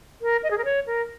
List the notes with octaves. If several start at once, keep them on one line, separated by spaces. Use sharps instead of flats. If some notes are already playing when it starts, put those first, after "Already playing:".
A#4
D#5
G#4
A#4
C#5
A#4